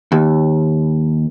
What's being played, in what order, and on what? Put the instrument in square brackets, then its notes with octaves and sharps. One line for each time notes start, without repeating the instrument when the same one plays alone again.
[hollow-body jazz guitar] D#2